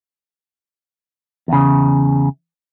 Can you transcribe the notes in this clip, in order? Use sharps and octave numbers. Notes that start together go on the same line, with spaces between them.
E2 C#3